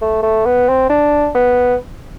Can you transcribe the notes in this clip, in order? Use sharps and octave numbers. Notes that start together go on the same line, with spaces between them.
A3
A3
B3
C4
D4
B3